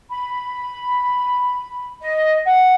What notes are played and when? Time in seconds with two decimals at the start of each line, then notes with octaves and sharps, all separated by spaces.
0.10 B5
2.01 D#5
2.45 F#5